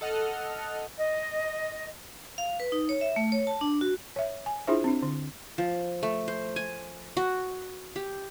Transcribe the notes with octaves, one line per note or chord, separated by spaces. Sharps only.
A4 D#5 F#5 F6
D#5
F5
B4
D#4
C#5
E5
A3
C#5
A5
D4
F#4
C#5 E5
G#5
D4 E4 F4 G#4 C5 E5
C4 D4
D3
F3
A3
C5
G#5
F#4
G4